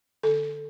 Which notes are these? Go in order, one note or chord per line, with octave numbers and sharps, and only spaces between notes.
D3 A4